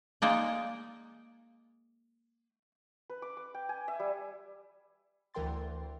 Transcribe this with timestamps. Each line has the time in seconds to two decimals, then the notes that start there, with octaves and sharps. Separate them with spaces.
0.22 G#3 A#3 D#4 D5
3.10 B4
3.22 D6
3.37 D6
3.54 G5
3.69 G#5
3.88 E5
4.00 G3
5.34 D2 E3 A#4 G5 C6 A6